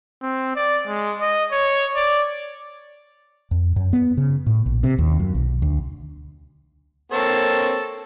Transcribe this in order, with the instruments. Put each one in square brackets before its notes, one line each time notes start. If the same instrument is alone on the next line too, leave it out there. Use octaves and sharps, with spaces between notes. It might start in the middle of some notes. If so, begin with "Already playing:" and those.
[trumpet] C4
D5
G#3
D#5
C#5
D5
[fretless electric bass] F2
F#2
B3
C#3
A2
A#1
C3
D#2
F#2
B1
D2
[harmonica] A#3 C4 C#5 [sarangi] A4